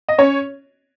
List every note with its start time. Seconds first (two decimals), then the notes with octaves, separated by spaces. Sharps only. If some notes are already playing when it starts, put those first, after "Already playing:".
0.09 D#5
0.18 C#4 C#5